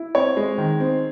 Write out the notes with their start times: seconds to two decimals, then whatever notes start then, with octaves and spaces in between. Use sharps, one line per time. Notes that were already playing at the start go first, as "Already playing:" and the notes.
Already playing: E4
0.15 C4 C#5
0.37 G#3
0.58 D#3
0.80 C4